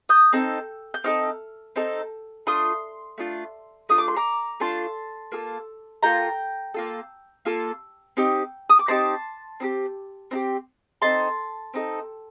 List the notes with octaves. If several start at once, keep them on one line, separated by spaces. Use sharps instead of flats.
D#6 G6
C4 D#4 A4
G6
C4 D#4 A4 F6
C4 D#4 A4
A3 D4 F4 C6 D#6
A3 D4 F4
A3 D4 F4 D#6
D6
C6
A#5 D6
A3 D4 F4 A5 C6
A#3 F4 A4
A#3 F4 A4 G5 A#5
A#3 F4 A4
A#3 F4 A4
C4 D#4 G4
D#6
D6
C4 D#4 G4 A5 C6
C4 D#4 G4
C4 D#4 G4
C4 D#4 A4 A5 C6
C4 D#4 A4